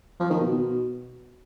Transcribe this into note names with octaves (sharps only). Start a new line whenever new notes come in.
F3
D#3
B2
B2